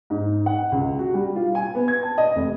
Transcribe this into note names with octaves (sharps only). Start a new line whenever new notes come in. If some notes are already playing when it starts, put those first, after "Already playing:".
G#2
F#5
C#2
F#4
G3
F4
G#5
B3
G#6
A5
D#5
F1